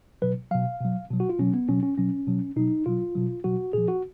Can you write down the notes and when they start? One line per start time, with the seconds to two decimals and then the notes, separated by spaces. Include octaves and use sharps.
0.22 B2 F#3 B4
0.51 B2 F#3 F5
0.81 B2 F#3
1.10 B2 F#3
1.20 F#4
1.29 F4
1.39 B2 F#3 C#4
1.54 B3
1.69 B2 F#3 C#4
1.83 C#4
1.98 B2 F#3 C#4
2.27 B2 F#3
2.56 B2 F#3 D#4
2.86 B2 F#3 F4
3.15 B2 F#3
3.44 B2 F#3 F#4
3.73 A#2 F3 G#4
3.88 F#4